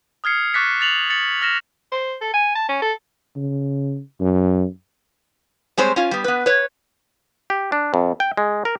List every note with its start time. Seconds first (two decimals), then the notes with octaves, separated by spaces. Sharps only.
0.24 D#6 F6 G#6 C7 C#7
0.54 C#6 D6 F#6 A6 B6 C#7
0.81 A6 F7 F#7
1.10 A6 C#7 F#7
1.42 F6 A#6 E7
1.92 C5
2.21 A4
2.34 G#5
2.55 A5
2.69 C#4
2.82 A4
3.36 C#3
4.20 F#2
5.78 G3 G#3 C4 C5 C#5
5.96 C#4 F4
6.11 G3 B3
6.24 B3 B4
6.46 B4 C#5
7.50 G4
7.72 D4
7.94 F2
8.20 G5
8.37 G#3
8.65 A#4